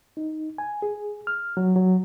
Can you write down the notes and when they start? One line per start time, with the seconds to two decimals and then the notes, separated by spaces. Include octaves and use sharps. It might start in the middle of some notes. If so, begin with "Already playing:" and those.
0.17 D#4
0.58 G#5
0.82 G#4
1.27 F6
1.57 F#3
1.76 F#3